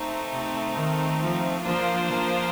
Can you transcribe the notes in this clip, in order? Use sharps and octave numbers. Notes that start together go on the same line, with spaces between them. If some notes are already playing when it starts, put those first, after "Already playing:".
Already playing: A3 C4 D#4
C3
D#3
F3
F3 A#3 D4 F4 C5
F3